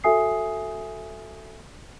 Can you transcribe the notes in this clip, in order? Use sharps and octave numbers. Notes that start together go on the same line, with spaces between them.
F#4 A4 E5 G#5 D#6 C7